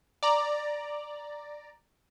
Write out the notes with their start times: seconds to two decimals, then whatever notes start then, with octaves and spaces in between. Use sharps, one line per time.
0.23 D5 A#5